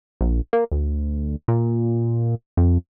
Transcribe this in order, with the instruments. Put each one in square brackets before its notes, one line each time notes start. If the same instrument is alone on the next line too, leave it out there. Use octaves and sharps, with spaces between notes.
[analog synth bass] A#1
A#3
D2
A#2
F2